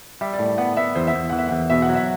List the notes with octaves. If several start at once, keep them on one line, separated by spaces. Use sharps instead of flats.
G3 E5
D5
A2
D5
B3 F#5
B3 E5
E2 C5
E5
E2
E3 F#5
E5
E2 F#5
B2 E5
F#5
F#3
E5